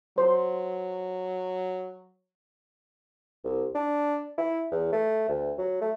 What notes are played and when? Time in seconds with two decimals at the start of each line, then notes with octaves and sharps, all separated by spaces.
0.18 F#3 C5
3.44 C2
3.75 D4
4.38 E4
4.72 E2
4.93 A3
5.29 D2
5.58 F#3
5.81 A3